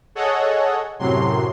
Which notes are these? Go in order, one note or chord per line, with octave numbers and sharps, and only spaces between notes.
G#4 A4 C#5 D#5 F#5
F#2 A2 C3 F#3 C6